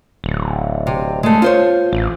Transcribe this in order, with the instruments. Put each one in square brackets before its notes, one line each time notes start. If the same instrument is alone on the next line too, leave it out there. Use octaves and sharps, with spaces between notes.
[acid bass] D1
[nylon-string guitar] C3
G#3 A3
F4 C5 C#5
[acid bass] A1